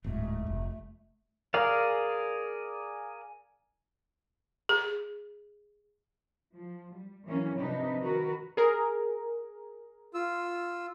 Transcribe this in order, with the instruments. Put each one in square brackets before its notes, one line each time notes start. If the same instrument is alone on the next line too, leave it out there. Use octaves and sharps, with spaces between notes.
[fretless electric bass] D1 G#2 [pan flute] A3
[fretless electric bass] F1
[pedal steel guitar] G#4 A#4 D5 F5
[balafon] G#4
[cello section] F3
G3
E3 F#3 A#3 C#4
C3 F3 D4 D#4 B4
D#3 F#4 A#4 B4
[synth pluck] G#4 A#4
[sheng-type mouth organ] F4 E6